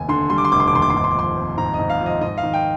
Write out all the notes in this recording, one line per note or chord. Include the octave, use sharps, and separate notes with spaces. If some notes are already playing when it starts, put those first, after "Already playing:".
Already playing: F1 D#2 G#5
D3 C6
G3 C6
D6
C6
F1 D6
C6
D6
D#2 C6
D6
C6
G#2 D6
C6
D6
F3 C6
C4
G#2 A#5
D#5
G#2
F5
F3
D#5
G#2 D#5
F5
D#3
G5